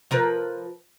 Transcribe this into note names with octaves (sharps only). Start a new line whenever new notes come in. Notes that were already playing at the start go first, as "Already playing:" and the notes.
F3 A#4 B4